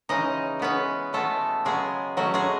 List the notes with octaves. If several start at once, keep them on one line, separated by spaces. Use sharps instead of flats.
C#3 E3 G#3 C#4 D#4 D#5
E3 G#3 B3 C#4 B4
B2 G#3 A3 B3 A4
C#3 F#3 G#3 B3 G#4
B2 F#3 A3 C#4 F#4
G#3 G#4